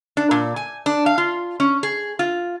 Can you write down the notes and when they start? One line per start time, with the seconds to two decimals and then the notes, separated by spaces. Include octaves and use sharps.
0.17 D4
0.31 A#2
0.56 G#5
0.86 D4
1.06 F5
1.18 F4
1.60 C#4
1.83 G#4
2.19 F4